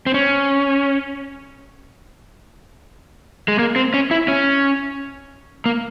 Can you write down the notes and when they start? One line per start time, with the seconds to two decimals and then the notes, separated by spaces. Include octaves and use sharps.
0.06 C4
0.14 C#4
3.48 G#3
3.59 A#3
3.76 C4
3.94 C#4
4.11 E4
4.28 C#4
5.66 A#3